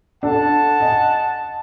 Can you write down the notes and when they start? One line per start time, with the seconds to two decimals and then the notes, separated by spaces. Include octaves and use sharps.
0.23 D4 A4 F#5 A5
0.80 D#5 G#5